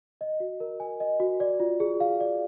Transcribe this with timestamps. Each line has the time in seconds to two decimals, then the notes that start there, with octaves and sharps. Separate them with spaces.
0.21 D#5
0.40 F#4
0.60 A#4
0.80 G#5
1.00 D#5
1.20 F#4
1.40 D5
1.60 F4
1.80 G#4
2.00 F5
2.20 D5